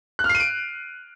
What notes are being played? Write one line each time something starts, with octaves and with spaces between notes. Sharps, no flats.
F#6
F6
C7
D#7
D7